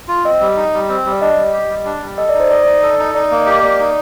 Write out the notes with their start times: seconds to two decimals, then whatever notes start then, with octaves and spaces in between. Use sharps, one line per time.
0.08 F4
0.24 C4 D#5
0.41 G3
0.57 D#4
0.73 G3
0.89 C4
1.06 G3
1.12 D5
1.21 D4 D#5
1.37 G3
1.53 G4
1.70 G3
1.85 D4
2.02 G3
2.18 A4 D#5
2.29 D#4 D5
2.40 C5
2.51 D5 D#5
2.66 D#4
2.82 A4
2.99 D#4
3.15 D#4 D5
3.31 A#3
3.38 D#5
3.46 G4
3.63 A#3 D5
3.80 D#4